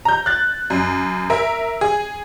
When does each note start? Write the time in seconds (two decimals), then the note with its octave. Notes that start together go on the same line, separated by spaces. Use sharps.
0.05 A#5 G6
0.26 F#6 A6
0.70 F#2
1.30 A#4 E5
1.81 G#4